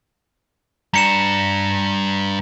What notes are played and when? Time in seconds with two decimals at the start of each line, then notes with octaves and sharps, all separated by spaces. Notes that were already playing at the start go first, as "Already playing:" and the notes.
0.94 G2 D4 A#5 C#7 E7